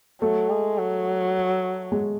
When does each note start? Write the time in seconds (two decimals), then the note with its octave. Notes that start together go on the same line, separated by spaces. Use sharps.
0.22 F#3 A3
0.50 G#3
0.78 F#3
1.92 G#3